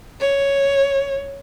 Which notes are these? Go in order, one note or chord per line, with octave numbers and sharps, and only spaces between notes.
C#5